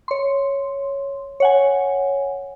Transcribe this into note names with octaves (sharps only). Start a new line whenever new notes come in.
C#5 C6
C#5 F#5 G#5